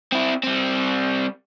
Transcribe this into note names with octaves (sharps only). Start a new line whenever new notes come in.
C4 E4
G3 C4